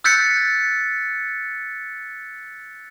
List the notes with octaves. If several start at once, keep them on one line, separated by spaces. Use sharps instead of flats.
E6 F#6 G6 A6 B6 C#7